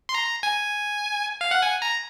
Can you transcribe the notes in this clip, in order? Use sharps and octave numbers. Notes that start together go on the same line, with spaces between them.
C6
A#5
G#5
F5
F#5
G#5
A#5